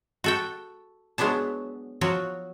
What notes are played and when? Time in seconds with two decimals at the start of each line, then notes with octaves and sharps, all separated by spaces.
0.24 F#4 A4 G5
1.18 F#3 G#3 B3 D4 A5
2.01 F3 F#3 F#4